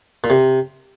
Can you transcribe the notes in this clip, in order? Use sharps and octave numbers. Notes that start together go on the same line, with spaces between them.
A#2
C3